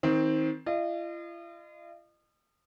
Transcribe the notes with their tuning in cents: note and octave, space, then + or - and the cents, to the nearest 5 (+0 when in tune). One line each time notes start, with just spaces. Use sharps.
D#3 +30 C4 +5
F4 -45 D#5 -35